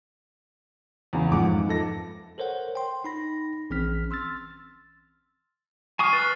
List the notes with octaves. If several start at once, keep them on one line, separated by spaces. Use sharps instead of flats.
E2 C#3
F2 G#2 F3 F#5 D6
A4 A#6
A4 A#4 C5 C#5 F#5
G5 C6
D#4 B5 A#6
A#1 E3 C4 C#4 F6 B6
C6 E6 F6 A6
G#5 C#6 D#6 F6 C7
B4 A6